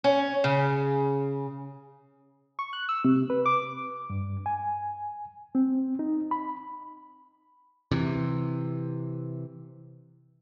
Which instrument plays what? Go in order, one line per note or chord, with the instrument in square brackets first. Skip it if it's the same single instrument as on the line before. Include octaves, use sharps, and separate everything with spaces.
[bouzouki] C#4
C#3
[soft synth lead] C#6
F#6
E6
C3
B4
D6
[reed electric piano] G2
G#5
C4
D#4
B5
[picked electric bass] C3 E3